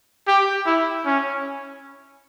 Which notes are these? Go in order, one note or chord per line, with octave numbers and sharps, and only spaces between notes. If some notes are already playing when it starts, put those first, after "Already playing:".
G4
E4
C#4